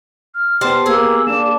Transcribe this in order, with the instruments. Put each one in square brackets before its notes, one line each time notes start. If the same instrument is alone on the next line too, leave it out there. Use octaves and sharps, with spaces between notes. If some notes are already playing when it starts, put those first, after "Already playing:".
[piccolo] F6
[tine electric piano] B3 G4 [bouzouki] C5 A5
[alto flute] A#3 [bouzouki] G#4 [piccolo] E6
[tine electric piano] A#3 [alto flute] D4 [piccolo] E7